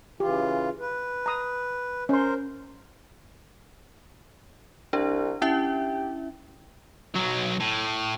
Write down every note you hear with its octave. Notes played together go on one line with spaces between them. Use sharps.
C#3 E3 F4 G4
B4
A#5 D#6
C#4 A#4 C5 C6
C2 D4
C#4 E4 G4 E5
B1 F#3
A2